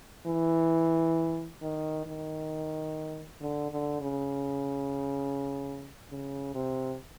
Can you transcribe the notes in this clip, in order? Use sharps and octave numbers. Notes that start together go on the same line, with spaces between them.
E3
D#3
D#3
D3
D3
C#3
C#3
C3